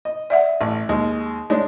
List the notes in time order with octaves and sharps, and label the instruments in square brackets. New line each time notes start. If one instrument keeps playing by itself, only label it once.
[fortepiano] D#5
[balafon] D5 E5 F#5
[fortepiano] A1
D#2 G#3
[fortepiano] G#3 D4 [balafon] C#5